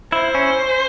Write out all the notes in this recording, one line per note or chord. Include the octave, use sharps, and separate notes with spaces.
E4 C5
C#4